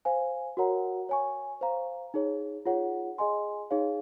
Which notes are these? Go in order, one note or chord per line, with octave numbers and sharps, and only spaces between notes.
C5 F5 G#5
F#4 A#4 C#5 F#5 A#5
C#5 G#5 C#6
C5 F5 A#5
D#4 G#4 C#5
F4 G#4 C#5 F#5
G#4 D#5 G#5 C6
D#4 G#4 C#5 F5